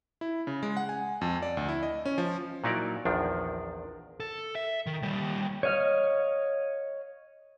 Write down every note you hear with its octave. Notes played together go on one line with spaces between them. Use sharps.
E4
C#3
G#3
F#5
G#5
F2
D5
D2
E4
D#5
C#4
F3
A#2 F#3 D#4 E4 A#4 D5
A#1 E2 D#3 F3 D4
A4
E5
D#3
D#2 G3
C#5 D#5 F5 F6